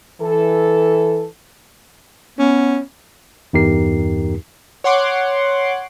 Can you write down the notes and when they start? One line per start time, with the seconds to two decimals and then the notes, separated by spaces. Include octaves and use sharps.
0.20 E3 A4
2.39 B3 C#4
3.53 E2 G2 D#4 G4 A#4 C7
4.84 C#5 F#5 C6 D6